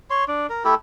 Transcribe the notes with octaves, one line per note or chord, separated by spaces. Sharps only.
C#5 C6
D4
A#4
A3 E4 G4 A4